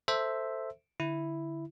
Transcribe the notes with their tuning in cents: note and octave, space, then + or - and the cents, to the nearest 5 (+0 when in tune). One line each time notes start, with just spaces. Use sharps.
A4 +15 C5 +0 E5 +0
D3 +0 E4 +0